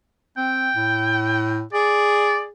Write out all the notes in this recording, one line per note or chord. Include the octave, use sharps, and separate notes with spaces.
C4 G5
A2
G#4 D5